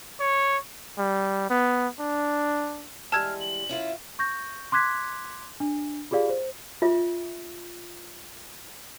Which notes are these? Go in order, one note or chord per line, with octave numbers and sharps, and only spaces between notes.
C#5
G3
B3
D4
E3 G3 G#3 A5 E6 F6 G#6
F#7
C#4 E4 F4
C#6 G6 A#6
C6 D6 F#6 G#6 B6
D4
F4 G4 G#4 D5 F5
C5
F4 E5